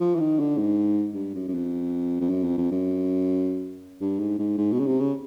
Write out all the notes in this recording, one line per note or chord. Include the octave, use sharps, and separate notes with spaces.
F3
E3
D#3
D3
G#2
G2
F#2
F#2
F2
F2
F#2
F2
F2
F#2
G2
G#2
G#2
G#2
B2
C#3
C3
C#3